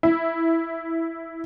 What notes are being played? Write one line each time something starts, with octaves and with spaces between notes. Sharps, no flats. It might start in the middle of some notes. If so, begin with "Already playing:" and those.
E4